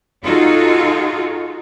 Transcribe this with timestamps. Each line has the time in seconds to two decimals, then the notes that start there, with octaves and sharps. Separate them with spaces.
0.24 D#4 F4 F#4 G#4 A4